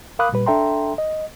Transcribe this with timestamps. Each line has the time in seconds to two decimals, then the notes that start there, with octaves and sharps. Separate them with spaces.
0.19 A#4 F5 B5 D6 D#6 F#6
0.32 A#2 G3 B4
0.46 D4 A4 E5 G5 A#5 C6
0.98 D#5